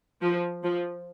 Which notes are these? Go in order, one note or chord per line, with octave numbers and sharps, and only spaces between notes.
F3
F3